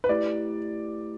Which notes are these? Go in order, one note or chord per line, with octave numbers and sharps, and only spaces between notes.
B4
A3 E4 G4 D5